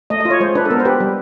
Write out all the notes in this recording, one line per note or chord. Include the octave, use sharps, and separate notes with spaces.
A3 D#5
D#5
F4
C#5
G#3 C5
D4 B4
A4
B3 A#4
C5
G4 B4
G3